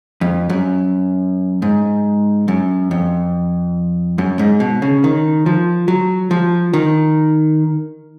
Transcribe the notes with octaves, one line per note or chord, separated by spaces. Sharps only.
F2
F#2
G#2
F#2
F2
F#2
G#2
B2
C#3
D#3
F3
F#3
F3
D#3